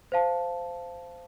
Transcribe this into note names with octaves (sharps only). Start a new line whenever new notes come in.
C5 F5 A5